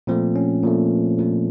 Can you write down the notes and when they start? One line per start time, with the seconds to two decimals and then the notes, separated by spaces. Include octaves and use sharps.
0.07 A#2 F3 A3 C4
0.36 C#4
0.63 A#2 F3 A3
1.19 A#2 F3 A3